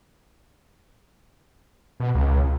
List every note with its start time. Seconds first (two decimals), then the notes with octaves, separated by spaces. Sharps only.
2.00 B2
2.15 C#2